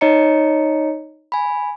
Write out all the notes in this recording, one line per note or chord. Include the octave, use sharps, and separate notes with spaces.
D#4 C#5 D#5 A#5 C#7
G#5 B5